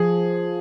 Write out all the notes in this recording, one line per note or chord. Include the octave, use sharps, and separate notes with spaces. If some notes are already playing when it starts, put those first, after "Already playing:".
Already playing: F3 G#4